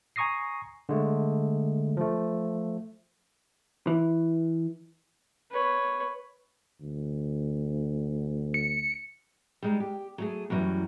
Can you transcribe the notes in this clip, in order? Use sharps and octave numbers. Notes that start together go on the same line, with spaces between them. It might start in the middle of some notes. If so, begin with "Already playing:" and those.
G#5 A#5 C#6 D#6 A#6 C7
D3 G#3 A3
F3 A3
E3
B4 C#5
D2
C#7
G3 G#3 D#4
G4
F#3 A3 G#4
F#2 E3 F#3 G3